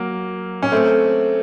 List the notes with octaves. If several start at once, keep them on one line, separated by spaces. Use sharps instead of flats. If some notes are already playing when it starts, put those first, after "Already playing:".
Already playing: F#3 A#3
C#4
A3 C4